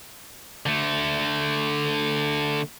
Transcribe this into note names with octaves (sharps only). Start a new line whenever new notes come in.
D3 A3